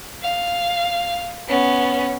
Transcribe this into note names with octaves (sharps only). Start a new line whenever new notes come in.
F5
B3 C#4